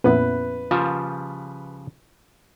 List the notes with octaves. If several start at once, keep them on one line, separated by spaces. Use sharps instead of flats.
F2 A#2 B3 C#4 E4 B4
C#3 F3 G3 F4